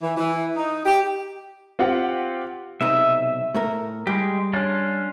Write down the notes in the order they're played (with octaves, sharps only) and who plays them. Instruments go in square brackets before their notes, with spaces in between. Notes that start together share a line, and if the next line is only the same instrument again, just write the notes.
[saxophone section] E3
E3
D#4
G4
[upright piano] C4 F4 G4 F#5
[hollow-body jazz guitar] B1 C3 D#4 [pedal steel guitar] E5
[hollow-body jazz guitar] A2 A3 A#4
[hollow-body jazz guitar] G3 [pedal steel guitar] G#3 G4
[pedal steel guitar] C#4 D4 F4